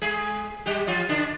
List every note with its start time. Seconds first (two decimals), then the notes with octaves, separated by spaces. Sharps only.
0.02 G#3 G#4
0.66 G3 G4
0.87 F3 F4
1.09 D3 D4